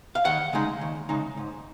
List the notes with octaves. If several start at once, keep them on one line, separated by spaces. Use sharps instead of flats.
F5
D#2 F#5
C#3 G#3 D#4
D#2
C#3 G#3 D#4
G#2